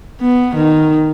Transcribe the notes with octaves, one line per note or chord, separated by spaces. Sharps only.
B3
D#3